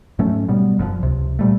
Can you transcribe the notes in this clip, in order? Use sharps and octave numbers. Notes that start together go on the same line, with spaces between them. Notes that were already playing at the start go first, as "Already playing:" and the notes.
G#2 F#3 A3 C#4
B2 F#3 G3 B3
F#1 F#2 C3 F3
C#2 C3
A#2 G3 A3